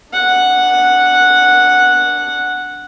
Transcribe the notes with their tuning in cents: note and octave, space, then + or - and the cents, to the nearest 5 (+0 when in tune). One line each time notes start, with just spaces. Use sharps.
D4 +0 F#5 -5